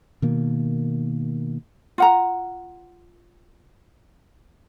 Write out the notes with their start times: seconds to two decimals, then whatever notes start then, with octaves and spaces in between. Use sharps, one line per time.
0.22 B2 D#3 A#3
1.98 F4 F#5 A#5